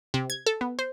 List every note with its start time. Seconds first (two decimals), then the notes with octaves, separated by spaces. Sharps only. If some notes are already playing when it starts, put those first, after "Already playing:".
0.14 C3
0.30 G#6
0.47 A4
0.61 B3
0.79 C5